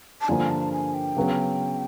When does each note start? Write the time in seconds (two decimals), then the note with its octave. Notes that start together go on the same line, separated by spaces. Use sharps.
0.21 A5
0.28 G2 D3 F3 A#3 G#5
0.50 A5
0.72 G#5
0.94 G5
1.17 C#3 F#3 B3